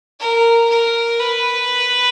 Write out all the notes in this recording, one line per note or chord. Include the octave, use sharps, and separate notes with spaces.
A#4
A#4
B4